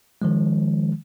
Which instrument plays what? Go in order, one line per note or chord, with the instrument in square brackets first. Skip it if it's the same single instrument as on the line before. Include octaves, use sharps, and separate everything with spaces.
[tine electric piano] D#3 F3 G#3